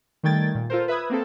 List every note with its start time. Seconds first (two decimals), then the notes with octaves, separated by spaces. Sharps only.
0.23 D#3 G3 A3 G5 G#6 A6
0.55 A#2
0.70 F4 A4 A#4 C5
0.88 B4 E5 B5 D#6 G#6
1.10 A#3 C4 A4